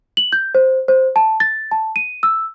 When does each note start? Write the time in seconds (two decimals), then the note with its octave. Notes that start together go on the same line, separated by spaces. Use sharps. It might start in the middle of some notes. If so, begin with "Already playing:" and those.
0.17 F#7
0.33 G6
0.55 C5
0.88 C5
1.16 A5
1.40 A6
1.71 A5
1.96 D#7
2.23 E6